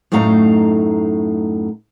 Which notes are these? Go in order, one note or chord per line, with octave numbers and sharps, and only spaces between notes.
F#2 A2 A3 D#4 F5 A#5